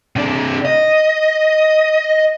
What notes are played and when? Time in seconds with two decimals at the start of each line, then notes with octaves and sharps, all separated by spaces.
0.16 C3 D4
0.65 D#5